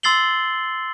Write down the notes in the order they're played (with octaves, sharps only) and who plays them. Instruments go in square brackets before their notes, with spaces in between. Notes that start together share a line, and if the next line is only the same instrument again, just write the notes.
[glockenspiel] C6 E6 A6 C7 F#7 G7